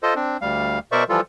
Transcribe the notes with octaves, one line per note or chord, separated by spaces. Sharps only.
F4 A4 C5 D#5
C4 D4
D2 G3 F5
B2 A#4 C5 D5 E5 C#6
E3 F3 G3 F4 A4